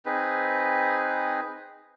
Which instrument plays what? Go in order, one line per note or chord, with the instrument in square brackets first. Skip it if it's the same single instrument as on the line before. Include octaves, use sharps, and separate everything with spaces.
[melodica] C4 D#4 G#4 B4